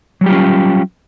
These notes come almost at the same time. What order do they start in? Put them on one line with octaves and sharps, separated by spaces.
F#3 G3 G4 F4 C#4